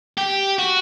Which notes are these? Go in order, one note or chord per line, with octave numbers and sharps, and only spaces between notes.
G4
F#4